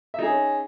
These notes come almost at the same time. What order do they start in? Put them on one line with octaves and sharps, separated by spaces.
E5 D#4 G#4 C#4